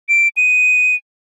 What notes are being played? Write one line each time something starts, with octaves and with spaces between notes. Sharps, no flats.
D7
D#7